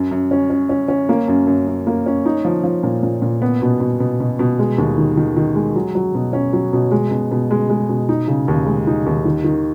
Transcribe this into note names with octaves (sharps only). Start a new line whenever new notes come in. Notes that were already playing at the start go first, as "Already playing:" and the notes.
Already playing: F#2
F#2
C#4
C#4
C#4
C#4
A#3
F#2
F#2
F#2
A#3
C#4
D#4
F3
F3
A#2
A#2
A#2
B3
B2
B2
B2
B2
B2
G#3
D#2
D#3
D#3
D#3
G#3
F#3
F#3
B2
C#4
F#3
B2
G#3
B2
B2
G#3
G#3
B2
D#4
C#3
D#2
G#3
D#4
D#2
D#3
D#3